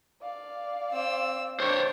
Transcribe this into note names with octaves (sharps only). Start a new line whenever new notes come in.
D5 F5
C4 E6
D4 C5 C#5 G5